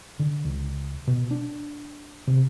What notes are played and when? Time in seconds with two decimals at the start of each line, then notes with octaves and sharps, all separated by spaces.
0.19 D3
0.45 C#2
1.07 B2
1.31 D4
2.27 C3